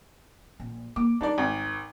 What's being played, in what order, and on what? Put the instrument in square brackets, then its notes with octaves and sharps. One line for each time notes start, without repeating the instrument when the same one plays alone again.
[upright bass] A#1
[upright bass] A#3 [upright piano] D6
[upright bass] G3 [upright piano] D4 D#4 D5
[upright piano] G#1